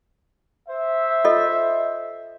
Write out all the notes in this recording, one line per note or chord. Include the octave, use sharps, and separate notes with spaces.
C5 E5
F4 A4 D#5